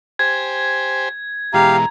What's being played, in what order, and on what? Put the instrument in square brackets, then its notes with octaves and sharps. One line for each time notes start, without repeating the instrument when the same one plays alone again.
[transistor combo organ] G4 C5 G#5 [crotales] G#6
[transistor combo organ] B2 E3 G#3 [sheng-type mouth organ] G4 F5 [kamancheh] A#5